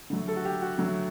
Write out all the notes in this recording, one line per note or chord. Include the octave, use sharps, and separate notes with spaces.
D3 F#3 A3
A4
F#4
G4
F#4
D3 F#3 A3